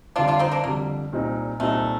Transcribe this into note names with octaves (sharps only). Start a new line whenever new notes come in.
F2 D3 G3 D4 F4
D4 F4
C4 D#4
A#3 D4
F2 D3 G3 A#3
C2 A#2 G3 C4 D#4
C2 A#2 G3 A3 C4 D#4